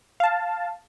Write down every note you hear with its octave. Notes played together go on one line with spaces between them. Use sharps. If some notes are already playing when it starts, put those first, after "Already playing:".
F5 A5